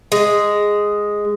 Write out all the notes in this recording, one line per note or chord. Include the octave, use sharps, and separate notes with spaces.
G#3